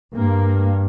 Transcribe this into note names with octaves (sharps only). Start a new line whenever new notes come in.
G2 A#3